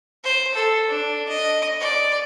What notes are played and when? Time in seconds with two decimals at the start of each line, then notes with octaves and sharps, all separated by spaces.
0.24 C5
0.54 A4
0.88 D4
1.28 D#5
1.80 D5